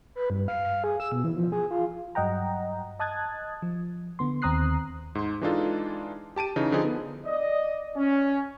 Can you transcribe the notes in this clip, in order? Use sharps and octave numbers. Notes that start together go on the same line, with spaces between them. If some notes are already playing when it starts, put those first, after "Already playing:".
B4
G2
F5
F5
G#4
E6
B2
E3
F3
G#4
F4
G2 F#3 D#5 F#5 G5 A#5
D#5 A5 D#6 F#6 G#6 A6
F3
D3 B3 C6
D#2 C4 A#5 D#6 F#6 C7
G#2 C6
E3 G#3 D4 D#4 F4 A4
G4 A5 D7 D#7
C#3 E3 D#4
D3 F3 D#4 G#4
B3
D5 D#5
C#4